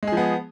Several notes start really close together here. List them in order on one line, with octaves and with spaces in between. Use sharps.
G#3 G#4 F3 B3